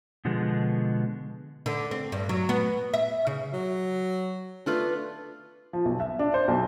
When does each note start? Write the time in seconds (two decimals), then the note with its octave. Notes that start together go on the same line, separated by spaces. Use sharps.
0.25 B2 D3 F3 G#3 B3
1.66 D3
1.91 C4
2.12 G2
2.29 F#3
2.49 B3
2.94 E5
3.27 C#3
3.53 F#3
4.66 A3 D4 F4 B4
5.73 F3
5.85 B1
6.00 E5
6.19 D4
6.34 C5
6.48 B1